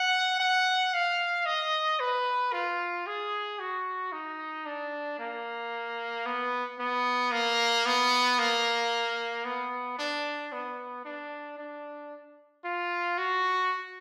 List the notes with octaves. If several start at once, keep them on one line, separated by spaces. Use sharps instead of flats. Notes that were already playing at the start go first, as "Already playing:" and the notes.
Already playing: F#5
F#5
F5
D#5
B4
F4
G#4
F#4
D#4
D4
A#3
B3
B3
A#3
B3
A#3
B3
D4
B3
D4
D4
F4
F#4